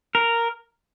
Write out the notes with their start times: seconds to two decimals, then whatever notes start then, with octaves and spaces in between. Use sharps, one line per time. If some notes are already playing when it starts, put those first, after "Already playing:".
0.15 A#4